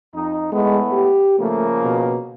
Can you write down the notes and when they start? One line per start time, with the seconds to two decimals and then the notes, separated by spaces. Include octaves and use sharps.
0.14 F2 D#4
0.52 A2 G#3 A3 B3
0.92 G4
1.39 C#3 F3 A3 A#3
1.82 B2